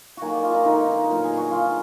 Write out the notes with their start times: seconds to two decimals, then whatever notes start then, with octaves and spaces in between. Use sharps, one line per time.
0.17 D#3 F#3 A#3 F#4 G#4
0.33 D5
0.43 F4
0.54 D#4
0.65 D3 G#3 B3 D#4
1.08 A#2 F#3 B3 A#4
1.24 G#4
1.37 F#4
1.51 F3 G#3 D4 F4